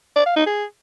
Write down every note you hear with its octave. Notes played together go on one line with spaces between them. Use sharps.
D5
F5
D#4
G#4